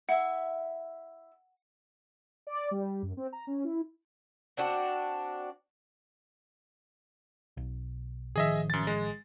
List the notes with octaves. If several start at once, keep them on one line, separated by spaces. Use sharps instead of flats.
E4 E5 F#5
D5
G3
F#2
C4
A#5
C#4
E4
C4 D4 F#4
B1
A1 D#3 F3 G#4 D#5 E5
F#2 A6
G#3